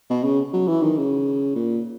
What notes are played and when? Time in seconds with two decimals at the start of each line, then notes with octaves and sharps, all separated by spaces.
0.10 B2
0.24 C#3
0.54 F#3
0.68 E3
0.83 D#3
0.97 C#3
1.55 A#2